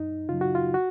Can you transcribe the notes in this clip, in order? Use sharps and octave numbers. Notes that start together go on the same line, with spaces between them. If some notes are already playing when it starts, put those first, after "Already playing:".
Already playing: F#2 D#4
C#3 F#3 F4
F#4
F4
F#4